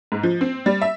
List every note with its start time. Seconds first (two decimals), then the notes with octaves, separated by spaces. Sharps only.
0.12 G#2
0.23 F3
0.41 C4
0.66 G3
0.81 E5